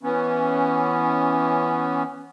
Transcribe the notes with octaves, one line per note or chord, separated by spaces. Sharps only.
E3 B3 C#4